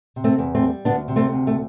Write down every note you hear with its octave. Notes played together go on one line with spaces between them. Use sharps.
C3
A3 C4
E2
A3 C4
G3
D2 B3 D4
C3
A3 C4
D2
A3